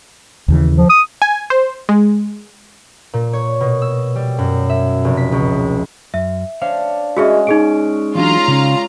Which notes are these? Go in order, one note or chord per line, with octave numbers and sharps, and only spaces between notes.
D#2 C#3 E3
F3
D#6
G#5
C5
G#3
A#2
C#5
B2
E6
G3
F#2
E5
F1
B6
C#2
F#2 E5
D4 C5 C#5 F5
G#3 C#4 F#4 G#4 E5
D#4 G#4 D7
E3 F#3 D4 F4 A#5
C#3 C#4